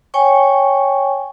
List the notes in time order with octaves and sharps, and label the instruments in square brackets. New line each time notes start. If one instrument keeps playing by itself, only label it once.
[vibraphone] C#5 G5 G#5 C#6